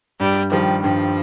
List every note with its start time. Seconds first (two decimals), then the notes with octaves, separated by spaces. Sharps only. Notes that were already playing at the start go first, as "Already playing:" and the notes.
0.20 G2 G3
0.52 D#3 F3 G3
0.84 G2 F3